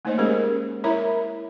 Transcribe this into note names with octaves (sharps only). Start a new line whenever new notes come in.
A3 A#3 D#4 C5 C#5 D#5
G#3 C#4 G4 G#4 A#4 C#5
E4 A#4 C#5 E5 A#5 B5